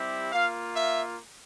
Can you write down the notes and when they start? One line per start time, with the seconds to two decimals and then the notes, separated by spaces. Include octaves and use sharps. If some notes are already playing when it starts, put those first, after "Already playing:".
Already playing: G3 C4 E4 G4
0.32 A#3 F4 F5
0.75 E5